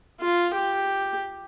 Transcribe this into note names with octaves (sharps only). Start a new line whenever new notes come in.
F4
G4